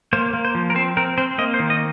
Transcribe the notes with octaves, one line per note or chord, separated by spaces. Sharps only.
A#3 C5
A#3
C5
F3
A#4
C4 C5
C4 A#4
C4 C5
A#3 D#5
C5
D#3
D#5